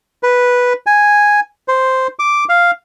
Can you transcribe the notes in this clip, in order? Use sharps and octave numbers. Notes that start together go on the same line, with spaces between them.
B4
G#5
C5
D6
F5